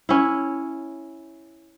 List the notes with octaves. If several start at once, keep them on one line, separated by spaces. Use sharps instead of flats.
C#4 E4